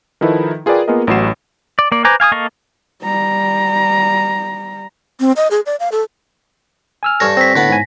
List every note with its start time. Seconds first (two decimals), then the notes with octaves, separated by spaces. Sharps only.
0.21 D#3 F3 D#4 E4 A4 B4
0.66 F4 G#4 A#4 B4 D5 G5
0.88 A#3 B3 F4 G#4 A#4 D#5
1.07 A1 A2 F#3 F#4 C7 E7
1.79 D5
1.92 A#3 D5
2.05 B4 C5 G#5 A#5 D6
2.20 F5 G#5 D6 D#6
2.32 A#3 A4 D#5 F5 C#6
3.03 G3 A#5
5.20 C4
5.36 D#5
5.51 G#4
5.66 D5
5.80 F5
5.92 A4
7.03 G#5 E6 F6
7.20 G2 C#4 A4 A#6
7.37 C4 A#6 B6
7.56 A2 D3 B3 B5
7.70 G#2 G#5